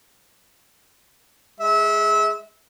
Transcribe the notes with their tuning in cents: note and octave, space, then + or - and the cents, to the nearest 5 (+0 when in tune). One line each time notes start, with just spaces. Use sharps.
G#3 +0 E5 -25